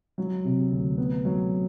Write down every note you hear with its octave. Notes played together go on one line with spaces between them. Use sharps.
F#3
C3
D2
B3
F#3